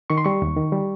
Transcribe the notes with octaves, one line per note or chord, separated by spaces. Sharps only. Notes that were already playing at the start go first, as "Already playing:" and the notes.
D#3 C#6
C6
G3 C#6
D#2
D#3
G3